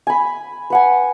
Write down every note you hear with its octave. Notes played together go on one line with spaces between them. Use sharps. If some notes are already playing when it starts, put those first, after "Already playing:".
G#5 B5
B4 F#5 G#5